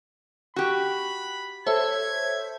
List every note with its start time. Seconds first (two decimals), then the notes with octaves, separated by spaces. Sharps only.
0.56 F#4 G4 B5
1.67 A4 C5 C#5 E5 G#6